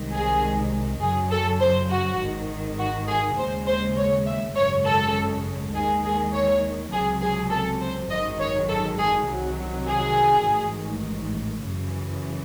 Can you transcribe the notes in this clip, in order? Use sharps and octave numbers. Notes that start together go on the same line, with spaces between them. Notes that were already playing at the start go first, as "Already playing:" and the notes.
Already playing: C2 C3 D#3 G#3
G#4
F#2 C#3 F#3 G#4
A4
C5
F#4
G#1 G#2 D#3
F#4
G#4
D#2 C#3 G#3 C5
C5
C#5
E5
G#1 F#2 C#3 G#3 C#5
A4
D#2 D#3 G#3 G#4
G#4
C#5
C#2 C3 F#3 G#4
G#4
A4
C5
G#1 F#2 D#3 G#3 D#5
C#5
A4
G#4
C2 C3 D#3 F#3
G#4
A1 G#2 D#3
F#2 C#3 E3